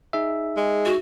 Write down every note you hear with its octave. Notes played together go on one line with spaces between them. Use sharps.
D#4 G#4 E5
G#3
F#4